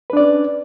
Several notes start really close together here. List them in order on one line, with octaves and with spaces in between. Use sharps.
B4 D4 D5 C#4